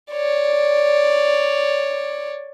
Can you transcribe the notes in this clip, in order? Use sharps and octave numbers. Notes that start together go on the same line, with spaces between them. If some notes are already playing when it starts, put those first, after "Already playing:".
C#5 D5